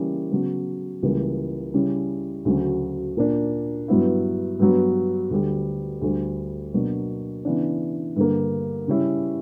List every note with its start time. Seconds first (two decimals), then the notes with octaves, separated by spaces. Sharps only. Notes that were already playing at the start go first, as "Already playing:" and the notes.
Already playing: C#3 E3 G3 A#3 C#4
0.31 C#3 F#3 B3
1.03 C#2 C#3 E3 G3 A#3
1.74 C#3 G3 C#4 E4
2.45 D2 C#3 F#3
3.17 A#2 A#3 D4
3.88 G2 F#3 B3 E4
4.59 G2 F#3 B3
5.31 D2 D3 G3
6.02 D2 D3 G3
6.74 B2 F#3 A#3 D4
7.45 C#3 E3 B3 D4
8.16 G2 D3 A#3
8.88 C#3 G3 C#4 E4